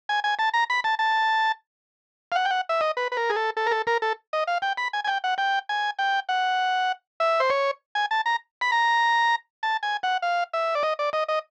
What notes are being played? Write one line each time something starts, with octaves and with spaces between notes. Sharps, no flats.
G#5
G#5
A5
A#5
B5
A5
A5
F5
F#5
G5
F#5
E5
D#5
B4
B4
A#4
G#4
A4
A4
A#4
A4
A#4
A4
D#5
F5
G5
B5
G#5
G#5
G5
F#5
G5
G#5
G5
F#5
E5
C5
C#5
G#5
A5
A#5
B5
A#5
A5
G#5
F#5
F5
E5
D5
D#5
D5
D#5
D#5